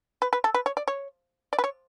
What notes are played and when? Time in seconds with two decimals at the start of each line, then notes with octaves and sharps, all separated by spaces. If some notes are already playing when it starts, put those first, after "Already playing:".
0.22 B4
0.33 B4
0.44 A4
0.54 B4
0.66 C#5
0.77 D5
0.88 C#5
1.53 D5
1.59 B4
1.64 C#5